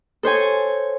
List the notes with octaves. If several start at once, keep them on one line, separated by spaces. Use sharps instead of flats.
A4 C5 C#5 G#5